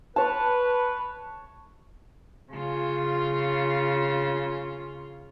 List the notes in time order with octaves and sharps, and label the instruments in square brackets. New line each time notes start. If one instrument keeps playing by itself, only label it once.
[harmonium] B4 [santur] C#5 A5
[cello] C#3 F4